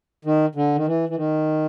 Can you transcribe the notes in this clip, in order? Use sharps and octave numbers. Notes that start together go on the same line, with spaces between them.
D#3
D3
D#3
E3
E3
D#3